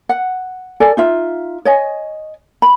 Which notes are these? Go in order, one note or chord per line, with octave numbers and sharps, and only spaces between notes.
F#5
A4 D5 G#5
D#4 F4 E5
C#5 D#5 G#5
B5